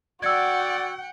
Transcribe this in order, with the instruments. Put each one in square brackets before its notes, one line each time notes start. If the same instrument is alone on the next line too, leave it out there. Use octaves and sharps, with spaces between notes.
[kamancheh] F#4 [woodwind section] D5 [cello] F#5 G5 [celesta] E6 G#6